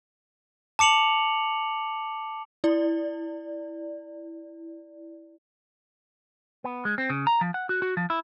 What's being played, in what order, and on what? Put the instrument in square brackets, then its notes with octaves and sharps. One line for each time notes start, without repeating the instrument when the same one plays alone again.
[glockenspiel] A5 D6 C#7 F7 F#7
[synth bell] E4 D5
[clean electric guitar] B3
G#3
C4
C#3
A#5
F3
F#5
F#4
F#4
F3
E4